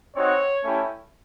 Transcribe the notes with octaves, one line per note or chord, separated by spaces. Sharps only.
C4 D#4 F#4 C#5
A3 C#4 E4 G4